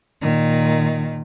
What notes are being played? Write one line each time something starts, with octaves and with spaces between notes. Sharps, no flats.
A#2 D#3